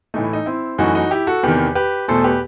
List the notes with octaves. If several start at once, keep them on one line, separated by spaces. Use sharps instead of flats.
A2 E3 A3 D#4
E4
D#4
C4 E4
F#2 E3 A3 D#4 F#4
D#4 F#4
E4 G4
F#4 A4
E2 C3 D#3 G4 B4
G4 B4
E2 B2 A3 A4 C5
G4 B4